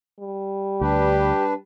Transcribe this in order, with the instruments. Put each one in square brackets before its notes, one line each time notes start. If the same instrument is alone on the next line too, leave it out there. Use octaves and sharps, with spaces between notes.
[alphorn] G3
[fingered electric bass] D2 [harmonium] D4 B4 [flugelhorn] G4